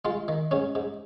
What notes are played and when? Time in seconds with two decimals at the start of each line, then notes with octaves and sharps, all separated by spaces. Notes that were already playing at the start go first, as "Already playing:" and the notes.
0.05 G#3 F4
0.28 D#3
0.51 G#2 C#4
0.75 G#2